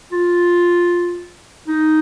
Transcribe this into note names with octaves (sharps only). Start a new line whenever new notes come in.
F4
D#4